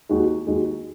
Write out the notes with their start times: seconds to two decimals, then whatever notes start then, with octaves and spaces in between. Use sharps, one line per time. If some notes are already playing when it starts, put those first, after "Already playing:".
0.09 D#2 D#3 G#3 D#4 F#4
0.47 D#2 D#3 G#3 D#4 F#4